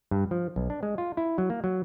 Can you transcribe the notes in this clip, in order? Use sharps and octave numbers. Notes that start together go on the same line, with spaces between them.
G2
F3
B1
D4
G#3
F4
E4
F#3
A#3
F#3